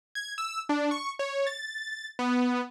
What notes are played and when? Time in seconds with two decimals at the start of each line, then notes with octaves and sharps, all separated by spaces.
0.15 G#6
0.38 E6
0.69 D4
0.91 C#6
1.19 C#5
1.47 A6
2.19 B3